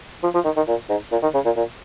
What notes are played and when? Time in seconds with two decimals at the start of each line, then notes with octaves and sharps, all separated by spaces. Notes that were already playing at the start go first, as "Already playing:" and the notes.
0.23 F3
0.34 F3
0.45 D#3
0.56 D#3
0.68 A#2
0.89 G#2
1.12 A#2
1.22 D#3
1.34 C#3
1.45 A#2
1.56 A#2